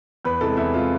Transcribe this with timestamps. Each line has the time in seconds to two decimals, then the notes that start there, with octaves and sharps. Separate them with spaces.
0.25 E2 B4
0.41 C3 E3 G#3 A4
0.57 E2 E4
0.74 C3 E3 G#3 F4